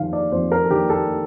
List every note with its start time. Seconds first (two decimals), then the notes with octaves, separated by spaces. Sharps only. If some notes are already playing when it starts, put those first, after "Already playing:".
Already playing: F2 D#3 F5
0.13 D5
0.32 F2 C5
0.52 A#4
0.65 A4
0.71 D#3 G4
0.90 A4